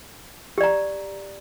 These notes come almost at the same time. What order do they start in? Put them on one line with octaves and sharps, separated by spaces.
G4 D5 A#5